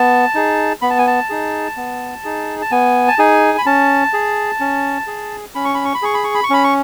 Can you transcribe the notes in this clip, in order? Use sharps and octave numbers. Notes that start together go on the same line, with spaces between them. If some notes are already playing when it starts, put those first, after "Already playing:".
Already playing: B3 A5
D#4 G#4
B3 B5
A5
G#5
A5
D#4 G#4
B3
D#4 G#4
A5
B3 G#5
A5
D#4 G#4 G#5
B5
C#4 A5
G#4
C#4
G#4
C#4 B5
C#6
B5
C#6
B5
G#4 C#6
B5
C#6
B5
C#6
C#4 B5
C#6